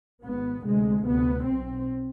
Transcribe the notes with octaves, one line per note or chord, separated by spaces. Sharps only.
G#1 G#2 B3
D2 C3 G#3
D2 C3 B3
B1 B2 C4